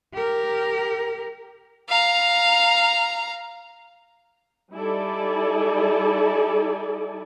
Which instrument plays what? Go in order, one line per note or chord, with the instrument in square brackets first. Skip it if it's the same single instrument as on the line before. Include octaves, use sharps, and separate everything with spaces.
[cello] G4 A#4
[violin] F5 A#5
[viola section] G3 D#4 E4 A4 D5 G#5